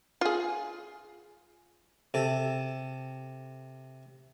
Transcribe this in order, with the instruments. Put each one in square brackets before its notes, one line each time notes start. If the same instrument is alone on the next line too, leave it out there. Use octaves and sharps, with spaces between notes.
[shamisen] F4 G#4
[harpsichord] C3 A4